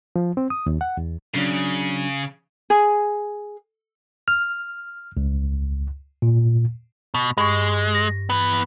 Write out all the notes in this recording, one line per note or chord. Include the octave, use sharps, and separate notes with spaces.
F3
C4
D#6
D#2
F#5
E2
C#3 F#3 C#4 D4
G#4
F6
C#2
A#2
B2
G2 G#3 C#6
A#6
E3 B3